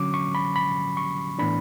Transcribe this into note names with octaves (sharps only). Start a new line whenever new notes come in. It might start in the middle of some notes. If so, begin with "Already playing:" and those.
Already playing: D3 F#3 C#4 D6
C#6
B5
B5
C#6
A2 E3 B3 D4 B5